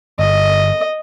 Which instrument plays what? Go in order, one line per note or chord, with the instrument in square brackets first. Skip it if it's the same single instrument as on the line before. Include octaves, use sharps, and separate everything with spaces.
[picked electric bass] G1 [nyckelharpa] D#5